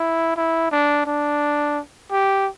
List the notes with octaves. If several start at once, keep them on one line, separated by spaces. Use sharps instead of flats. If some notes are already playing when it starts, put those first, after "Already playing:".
Already playing: E4
E4
D4
D4
G4